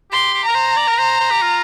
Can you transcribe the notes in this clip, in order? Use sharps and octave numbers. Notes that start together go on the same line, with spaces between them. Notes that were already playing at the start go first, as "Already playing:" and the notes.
G4 C6
G4
A#4 A#5
C5
D5
A#4
C5
C5
G4
F4